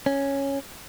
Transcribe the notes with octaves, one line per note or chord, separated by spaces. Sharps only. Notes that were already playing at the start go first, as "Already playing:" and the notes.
C#4